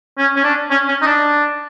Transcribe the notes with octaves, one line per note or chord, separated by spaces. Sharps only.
C#4
C#4
D4
C#4
C#4
D#4
D4